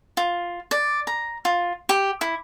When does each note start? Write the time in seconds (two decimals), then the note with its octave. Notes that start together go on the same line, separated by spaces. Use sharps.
0.17 F4
0.71 D5
1.07 A#5
1.45 F4
1.89 G4
2.21 E4